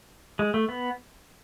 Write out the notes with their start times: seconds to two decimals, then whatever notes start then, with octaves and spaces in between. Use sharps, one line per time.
0.39 G#3
0.54 A3
0.69 B3